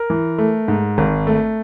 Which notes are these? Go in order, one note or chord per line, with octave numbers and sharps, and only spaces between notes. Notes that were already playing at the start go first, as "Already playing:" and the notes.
Already playing: A#4
E3
A3
G#2
G#1
A3